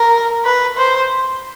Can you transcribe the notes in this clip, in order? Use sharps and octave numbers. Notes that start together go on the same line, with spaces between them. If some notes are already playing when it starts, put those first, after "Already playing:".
Already playing: A#4
B4
C5